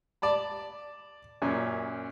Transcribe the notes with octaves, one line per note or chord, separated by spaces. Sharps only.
D5 A5 B5
F#2 A#2 C#4